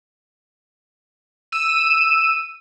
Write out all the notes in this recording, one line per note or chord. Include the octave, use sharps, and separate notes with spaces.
E6 D#7